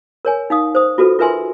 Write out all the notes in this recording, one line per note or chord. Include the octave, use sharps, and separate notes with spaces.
A#4 C#5 G#5
D#4 F5 D#6
C5 D#6
F4 F#4 A4 B4
F4 A#4 B4 E5 G#5 C6